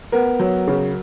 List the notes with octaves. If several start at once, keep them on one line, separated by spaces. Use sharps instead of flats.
B3 A#4
F#3
C#3